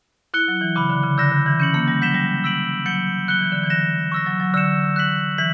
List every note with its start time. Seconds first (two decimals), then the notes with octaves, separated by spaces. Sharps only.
0.34 E4 F#6 C#7 G7
0.48 F#3
0.61 E3
0.75 C#3 B5 D6 F#6
0.90 D3
1.03 C#3
1.18 D3 E6 G6 A#6 E7
1.32 D3
1.46 E3
1.59 C#4 G6 C#7 F#7
1.74 A#3
1.88 G3
2.01 F#3 G6 B6 E7 G7
2.14 G3
2.44 E6 B6 D7 F#7
2.86 F#3 G6 C#7 G7
3.28 F#3 F#6 C#7 G7
3.40 E3
3.52 D3
3.64 E3
3.70 F#6 A#6 E7 G7
4.12 C#6 E6 A#6
4.26 F#3
4.40 F#3
4.54 D3 E6 G6 C#7 E7
4.96 F#6 B6 F#7
5.38 E3 B6 F#7